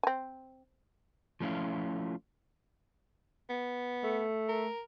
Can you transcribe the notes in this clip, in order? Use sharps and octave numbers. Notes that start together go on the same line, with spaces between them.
C4 G#5
F3 A3 C#4 E4 F4
B3
A3
A#4